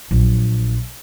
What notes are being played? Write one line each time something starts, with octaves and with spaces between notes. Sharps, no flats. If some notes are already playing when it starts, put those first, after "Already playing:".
A#1 F#3